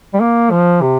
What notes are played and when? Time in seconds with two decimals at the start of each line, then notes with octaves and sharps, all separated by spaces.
0.14 G3
0.20 A#3
0.51 F3
0.82 C3